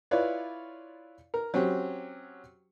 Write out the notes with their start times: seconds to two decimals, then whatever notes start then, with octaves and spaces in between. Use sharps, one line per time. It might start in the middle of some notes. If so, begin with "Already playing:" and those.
0.11 E4 F4 B4 C#5 D5 F5
1.34 A#4
1.54 F#3 C4 C#4 G4